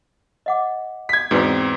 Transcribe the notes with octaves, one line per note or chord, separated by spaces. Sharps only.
D#5 F#5 D6
G#6 B6
E2 G#2 C4 F#4 B4 D5